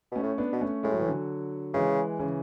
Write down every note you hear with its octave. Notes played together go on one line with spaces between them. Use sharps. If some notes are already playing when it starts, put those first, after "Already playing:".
B2 A3 C#4
A2
B3 D4
B2
A3 C#4
A2 G#3
F#3
E3
D3 F#3
C#3 E3 G#3
C#3 E3